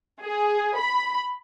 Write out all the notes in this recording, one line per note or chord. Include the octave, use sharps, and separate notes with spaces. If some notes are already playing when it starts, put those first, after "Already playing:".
G#4
B5